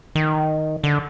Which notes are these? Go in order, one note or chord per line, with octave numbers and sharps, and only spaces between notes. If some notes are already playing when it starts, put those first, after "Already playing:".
D#3
D3